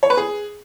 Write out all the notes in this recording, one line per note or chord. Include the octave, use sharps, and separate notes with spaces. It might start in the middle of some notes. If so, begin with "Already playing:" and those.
C#5
B4
G#4